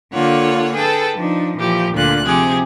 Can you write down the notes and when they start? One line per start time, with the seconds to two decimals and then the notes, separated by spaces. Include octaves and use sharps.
0.13 D3 A#3 F4 A4 C#5 F#5
0.74 G#4 A4 B4 G5 A5
1.16 F3 D4 D#4
1.57 A#2 E3 F3 G4
1.93 D2 A#2 D3 F4 F#6
2.25 C3 F3 G4 G#4